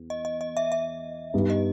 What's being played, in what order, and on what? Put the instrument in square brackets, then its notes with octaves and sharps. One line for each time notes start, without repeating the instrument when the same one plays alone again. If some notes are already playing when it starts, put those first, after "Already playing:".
Already playing: [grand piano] E2
[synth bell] D#5
D#5
D#5
E5
E5
[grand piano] G2 G3 B3 D#4
[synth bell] D#5